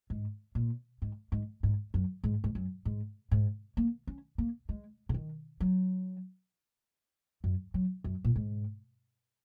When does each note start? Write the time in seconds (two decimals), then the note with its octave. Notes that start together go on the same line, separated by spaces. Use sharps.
0.10 G#2
0.55 A#2
1.02 G#2
1.32 G#2
1.63 G#2
1.94 F#2
2.24 G#2
2.44 G#2
2.55 F#2
2.85 G#2
3.31 G#2
3.77 A#3
4.07 C#4
4.38 A#3
4.69 G#3
5.09 C#3
5.14 D#3
5.60 F#3
7.44 F#2
7.74 F#3
8.04 F#2
8.24 A#2
8.36 G#2